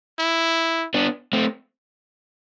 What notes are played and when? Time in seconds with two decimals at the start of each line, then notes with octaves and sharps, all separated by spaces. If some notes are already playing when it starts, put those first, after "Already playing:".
0.19 E4
0.94 B3 D4
1.33 A3 C4